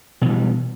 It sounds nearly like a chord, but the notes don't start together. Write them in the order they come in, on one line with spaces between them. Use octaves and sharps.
B2 E3 G3